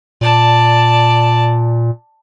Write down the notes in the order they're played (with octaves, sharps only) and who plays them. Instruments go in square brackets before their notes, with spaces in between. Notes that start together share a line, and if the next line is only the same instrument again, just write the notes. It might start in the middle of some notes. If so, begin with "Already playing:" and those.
[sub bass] A#2 [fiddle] D5 A5